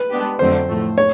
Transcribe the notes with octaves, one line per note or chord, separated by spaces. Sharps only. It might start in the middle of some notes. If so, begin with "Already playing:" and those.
Already playing: B4
G#3 B3 D4 G4
F2 D3 F#3 A3 C4 C5
A2 F3 A3
C#5